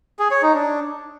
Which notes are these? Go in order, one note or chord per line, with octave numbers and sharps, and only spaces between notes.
G#4
C#5
D#4
D4